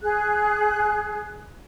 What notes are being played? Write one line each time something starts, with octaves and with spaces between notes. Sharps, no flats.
G#4 F#6